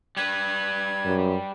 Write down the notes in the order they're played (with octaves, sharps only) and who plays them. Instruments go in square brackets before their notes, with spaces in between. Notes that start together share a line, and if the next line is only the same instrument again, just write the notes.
[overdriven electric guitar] G3 B4 [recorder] G#6
[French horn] F#2